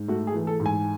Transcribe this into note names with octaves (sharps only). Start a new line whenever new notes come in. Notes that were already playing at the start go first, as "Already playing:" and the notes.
Already playing: G#2
A3 F#4
G#4
E3
A4
G#2
G#5